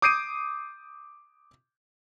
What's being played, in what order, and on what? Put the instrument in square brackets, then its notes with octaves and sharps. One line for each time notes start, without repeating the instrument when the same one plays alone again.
[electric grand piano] D6 D#6 G6 C7 D7 D#7